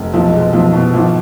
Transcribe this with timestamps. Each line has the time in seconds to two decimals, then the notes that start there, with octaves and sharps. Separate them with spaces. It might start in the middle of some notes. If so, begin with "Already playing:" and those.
Already playing: F1
0.13 B1 F3
0.33 B2 G#3
0.53 B1 F3
0.73 B2 E3
0.94 G#1 F3